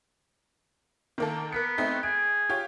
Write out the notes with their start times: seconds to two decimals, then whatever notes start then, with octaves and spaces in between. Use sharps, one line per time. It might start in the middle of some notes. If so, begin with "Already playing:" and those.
1.18 D#3 A#3 A4
1.52 B3 A#4 B6 C#7
1.78 A3 C4 D#4
2.03 G#4 D7
2.50 F4 G4 C#5